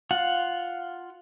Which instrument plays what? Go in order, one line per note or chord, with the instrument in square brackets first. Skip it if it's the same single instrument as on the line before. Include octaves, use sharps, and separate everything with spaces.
[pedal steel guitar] F4 F#5